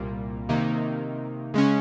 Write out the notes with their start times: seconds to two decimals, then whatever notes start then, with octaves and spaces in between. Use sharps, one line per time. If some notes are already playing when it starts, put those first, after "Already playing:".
Already playing: C2 A#2 G3 A#3 F4
0.49 C3 D#3 A#3 D#4
1.54 C#3 G#3 C#4